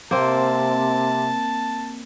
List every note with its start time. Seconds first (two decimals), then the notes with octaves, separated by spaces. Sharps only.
0.11 C3 A#3 C4 A5